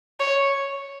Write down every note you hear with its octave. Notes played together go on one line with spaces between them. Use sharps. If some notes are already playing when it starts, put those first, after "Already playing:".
C#5